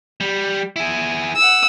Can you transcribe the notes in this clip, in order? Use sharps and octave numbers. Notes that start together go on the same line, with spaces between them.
G3
E4 G#4
F#5 E6